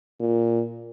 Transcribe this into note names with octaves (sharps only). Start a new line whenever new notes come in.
A#2